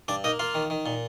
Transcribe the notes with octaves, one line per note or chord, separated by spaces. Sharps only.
G2 D4 D5
A#3 D#4 D#5
A#3 F4 F5
D#3
D#3
A#2